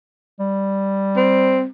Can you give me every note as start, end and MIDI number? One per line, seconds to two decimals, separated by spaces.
0.40 1.67 55
1.17 1.66 60